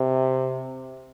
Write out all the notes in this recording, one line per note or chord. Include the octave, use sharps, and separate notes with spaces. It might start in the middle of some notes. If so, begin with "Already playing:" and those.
Already playing: C3